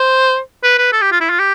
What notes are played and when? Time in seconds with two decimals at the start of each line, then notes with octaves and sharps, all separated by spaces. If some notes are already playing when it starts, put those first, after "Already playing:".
Already playing: C5
0.64 B4
0.78 B4
0.93 A4
1.02 G4
1.12 F4
1.21 E4
1.30 F4
1.39 G4